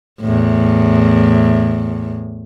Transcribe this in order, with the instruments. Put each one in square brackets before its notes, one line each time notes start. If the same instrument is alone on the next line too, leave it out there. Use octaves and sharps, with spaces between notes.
[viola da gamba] E2 A2